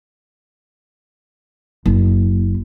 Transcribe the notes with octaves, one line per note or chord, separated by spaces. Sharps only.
F#1